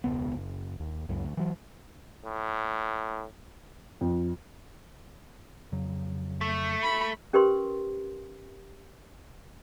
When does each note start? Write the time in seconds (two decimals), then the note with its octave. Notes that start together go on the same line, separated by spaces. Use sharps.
0.04 E1 C#2 B3
0.35 F#1
0.80 D#2
1.09 C#2 F#2
1.25 D2
1.37 E3 F#3
2.25 A2
4.01 F2
5.72 F2 C#3 F#3
6.41 A3
6.83 B5
7.33 C#4 G4 A#4 B4 C6